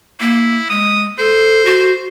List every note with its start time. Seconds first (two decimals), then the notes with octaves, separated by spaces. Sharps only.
0.20 A#3 E4
0.70 G#3 D#6
1.18 A4 C5
1.65 F#4